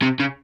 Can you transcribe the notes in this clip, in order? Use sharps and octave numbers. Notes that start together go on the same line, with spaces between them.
C3
C#3